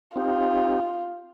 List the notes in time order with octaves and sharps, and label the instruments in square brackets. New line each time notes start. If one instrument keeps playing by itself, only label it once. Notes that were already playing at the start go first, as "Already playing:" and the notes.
[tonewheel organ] C4 D#4 G4 [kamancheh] F4